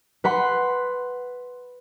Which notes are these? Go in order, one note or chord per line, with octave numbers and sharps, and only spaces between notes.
B4 F#5 B5 C6